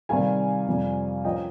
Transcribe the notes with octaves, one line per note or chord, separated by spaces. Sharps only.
C3 D#3 G3 F5 G#5
F2 C3 G3
A#2 F3 A#3 C#4 D#5 G5